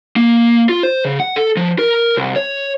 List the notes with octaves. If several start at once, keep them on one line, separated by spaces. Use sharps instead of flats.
A#3
F4
C5
C#3
F#5
A4
F3
A#4
C2
C#5